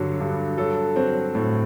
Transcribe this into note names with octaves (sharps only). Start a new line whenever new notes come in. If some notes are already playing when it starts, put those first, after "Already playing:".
Already playing: G2 D3 F#3 A4
G2
F#3 A4
F#3 C4
A2